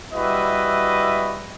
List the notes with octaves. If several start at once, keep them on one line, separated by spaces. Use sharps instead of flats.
G3 E4 F#4 B4 D#5 E5